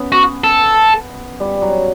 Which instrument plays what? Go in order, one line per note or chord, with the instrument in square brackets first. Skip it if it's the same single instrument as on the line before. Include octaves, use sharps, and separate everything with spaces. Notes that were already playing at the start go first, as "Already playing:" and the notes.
Already playing: [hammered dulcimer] B3 C#4
[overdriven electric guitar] F#4
A4
[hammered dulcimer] G3
F#3